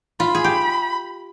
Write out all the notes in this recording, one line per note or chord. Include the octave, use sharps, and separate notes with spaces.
F4 B5
G#4
G4